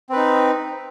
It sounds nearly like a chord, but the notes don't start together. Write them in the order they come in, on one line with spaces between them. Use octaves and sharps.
C4 B4 D#4